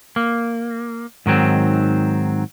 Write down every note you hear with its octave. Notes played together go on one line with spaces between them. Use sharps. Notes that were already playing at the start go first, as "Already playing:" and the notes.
A#3
G#2 D#3 F#3 C4